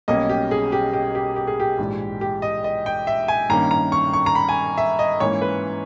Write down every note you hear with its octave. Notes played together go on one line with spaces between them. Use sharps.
B1 B2 G3 A#3 C#4 D#5
G4
G#4
G4
G4
G4
G4
G#4
G4
A#1 G#2 E3 G#3
G4
D#5
D#5
G5
E5
G#5
G2 D#3 A#3 C#4 A#5
A#5
C#6
C#6
A#5
B5
G#5
E5
D#5
G#2 E3 A#3 C#4 C#5
B4